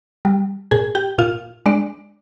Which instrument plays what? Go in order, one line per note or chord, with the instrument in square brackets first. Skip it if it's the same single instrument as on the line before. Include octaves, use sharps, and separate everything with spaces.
[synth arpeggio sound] G3
A#2 G#4 G#5
G4 G5
A#2 F4 F5
G#3 D4 D5